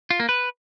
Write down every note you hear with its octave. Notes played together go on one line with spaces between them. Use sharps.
F4
A#3
B4